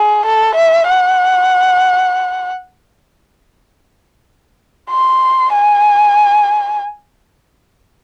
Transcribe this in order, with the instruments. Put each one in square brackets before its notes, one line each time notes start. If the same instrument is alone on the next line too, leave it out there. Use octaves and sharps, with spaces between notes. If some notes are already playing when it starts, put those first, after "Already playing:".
Already playing: [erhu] G#4
A4
E5
F#5
C6
G#5